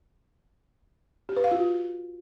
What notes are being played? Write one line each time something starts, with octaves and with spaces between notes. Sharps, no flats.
G4
B4
F5
F4
F#4